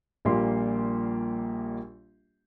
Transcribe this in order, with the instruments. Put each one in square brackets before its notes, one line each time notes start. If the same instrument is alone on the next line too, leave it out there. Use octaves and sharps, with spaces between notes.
[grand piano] A#1 A#2 G3 A#3 G4 C6